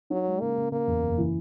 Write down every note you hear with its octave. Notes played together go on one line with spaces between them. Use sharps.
F#3 D#4
G#3
C#3 A#3
C#3
C#3 A#3
E2
F#1
E3